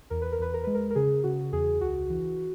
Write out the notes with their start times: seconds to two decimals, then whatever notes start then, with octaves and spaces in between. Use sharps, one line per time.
0.10 E2 A#4
0.22 B4
0.32 A#4
0.39 E2 B4
0.54 A#4
0.64 G#3 B4
0.75 A#4
0.91 A#4
0.95 C#3 G#4
1.24 C#3 F#4
1.53 E2 G#4
1.81 C#2 F#4
2.09 E3